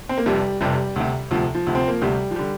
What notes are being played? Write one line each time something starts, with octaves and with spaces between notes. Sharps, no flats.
C4
A#3
F1 F2 C3 G3
F1 F2 C3 G3
D2 C3
D2 C3 F3
F3
D2 C3
C4
A#3
D2 C3 G3
F3
D3 G3